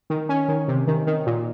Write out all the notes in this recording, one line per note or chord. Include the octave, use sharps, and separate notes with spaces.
D#3
C#4
D#3
C3
D#3
D#3
A#2